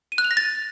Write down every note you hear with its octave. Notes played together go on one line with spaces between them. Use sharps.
D#7
F#6
F7
A#6
A6